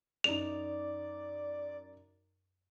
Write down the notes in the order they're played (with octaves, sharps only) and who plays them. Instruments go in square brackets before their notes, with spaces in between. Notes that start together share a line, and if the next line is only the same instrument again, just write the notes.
[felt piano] F#2 D#4 [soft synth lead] D5 [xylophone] F7